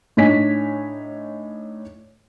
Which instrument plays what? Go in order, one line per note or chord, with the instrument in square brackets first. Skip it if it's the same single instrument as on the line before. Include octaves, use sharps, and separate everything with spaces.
[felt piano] A2 D4 D#4 C#5 G#5 B6